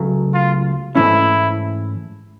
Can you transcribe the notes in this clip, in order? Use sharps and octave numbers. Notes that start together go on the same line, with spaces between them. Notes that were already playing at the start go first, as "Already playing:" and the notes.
Already playing: C#2 C#3 F#3 A3
F4
G#2 E3 A3 C#4 E4